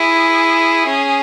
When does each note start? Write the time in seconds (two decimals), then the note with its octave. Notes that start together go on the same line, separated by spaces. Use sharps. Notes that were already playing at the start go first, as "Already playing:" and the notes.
Already playing: E4 G#4
0.86 C#4